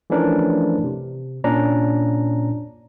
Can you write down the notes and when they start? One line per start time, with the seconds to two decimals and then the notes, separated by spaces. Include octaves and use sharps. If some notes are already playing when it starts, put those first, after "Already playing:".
0.10 E3 F3 A3 C#4 D4 A#4
0.84 C3
1.44 A#2 C#4 D4 A#5